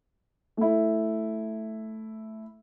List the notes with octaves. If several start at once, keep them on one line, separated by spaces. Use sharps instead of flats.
A3 E4